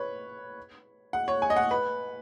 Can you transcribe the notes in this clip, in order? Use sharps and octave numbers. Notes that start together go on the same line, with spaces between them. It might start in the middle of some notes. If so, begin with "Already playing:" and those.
Already playing: B4 C#5
F#5
C#5
G#5
D#5
F#5
B4